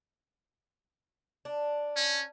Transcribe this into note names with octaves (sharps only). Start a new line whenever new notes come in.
D4
C#4